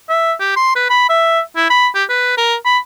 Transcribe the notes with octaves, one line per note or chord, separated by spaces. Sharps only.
E5
G4
C6
B4
B5
E5
E4
B5
G4
B4
A#4
B5